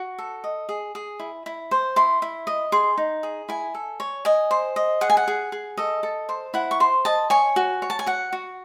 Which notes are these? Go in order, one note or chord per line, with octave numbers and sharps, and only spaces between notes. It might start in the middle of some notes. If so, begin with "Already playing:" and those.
Already playing: F#4
A4
D#5
G#4
G#4
E4
E4
C5
E4 C6
E4
D#5
G#4 C6
D#4
G#4
E4 G#5
A4
C#5
D#5 G#5
C5
D#5
G#4 F#5
G#5
F#5
G#4
G#4
A4 D#5
A4
C5
E4 F#5
C#6
C5 C6
D#5 A5
C#5 G#5
F#4
C#5
A5
G#5
F#4 F#5
F#4